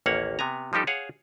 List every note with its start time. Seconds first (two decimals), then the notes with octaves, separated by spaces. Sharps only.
0.06 A1 D#2 A#3 C#4 C#5 F#5
0.39 C3 B3 G#5 A#5
0.73 F3 G3 D#4 G4 A4
0.87 G#4 C#5 F5 F#5